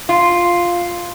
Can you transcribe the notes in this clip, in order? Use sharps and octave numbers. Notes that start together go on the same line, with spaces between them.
F4